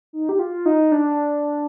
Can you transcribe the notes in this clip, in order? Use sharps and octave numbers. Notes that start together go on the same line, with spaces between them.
D#4
G4
F4
D#4
D4